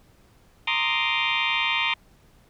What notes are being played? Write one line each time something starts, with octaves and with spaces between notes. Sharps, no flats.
A#5 C6 D6 D#6